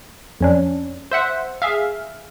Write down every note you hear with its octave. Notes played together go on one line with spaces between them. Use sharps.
F2 C#4 D4
C5 E5 F#5
G#4 E5 F5